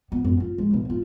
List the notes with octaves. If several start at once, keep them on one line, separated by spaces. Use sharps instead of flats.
B3
F#2
F4
G#3
B1
F4